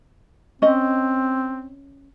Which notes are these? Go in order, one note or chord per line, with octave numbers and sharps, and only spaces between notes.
C4 C#4 D#5